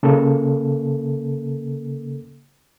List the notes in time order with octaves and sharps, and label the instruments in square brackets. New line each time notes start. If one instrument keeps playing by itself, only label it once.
[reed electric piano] C#3 A#3 A4